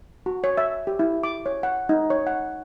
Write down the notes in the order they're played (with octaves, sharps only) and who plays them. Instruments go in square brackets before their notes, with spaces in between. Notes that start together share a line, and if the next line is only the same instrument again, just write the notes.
[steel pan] F#4
C#5
E5
G4
E4
D6
C#5
F#5
D#4
C#5
F#5